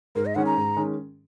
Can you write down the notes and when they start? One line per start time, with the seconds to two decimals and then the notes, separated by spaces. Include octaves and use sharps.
0.15 G#2 A#4
0.26 D#5
0.35 D#3 G#3 C#4 F#5
0.46 A#5
0.57 G#2
0.77 D#3 G#3 C#4